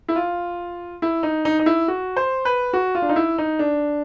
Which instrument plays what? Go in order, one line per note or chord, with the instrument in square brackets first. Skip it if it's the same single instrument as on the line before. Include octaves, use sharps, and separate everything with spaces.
[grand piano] E4
F4
E4
D#4
D#4
D#4
E4
F#4
C5
B4
F#4
F4
D4
D#4
E4
D#4
D4